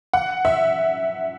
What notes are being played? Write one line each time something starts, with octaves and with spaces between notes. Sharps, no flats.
F#5
E5